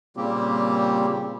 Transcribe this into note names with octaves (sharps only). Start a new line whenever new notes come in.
A#2 C#3 G3 A#3 C4 G4